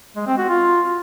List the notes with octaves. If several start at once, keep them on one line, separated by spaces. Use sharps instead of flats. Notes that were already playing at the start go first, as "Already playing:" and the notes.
G#3
C4
F#4
F4